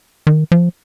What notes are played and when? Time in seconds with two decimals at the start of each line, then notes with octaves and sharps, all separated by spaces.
0.27 D#3
0.52 F3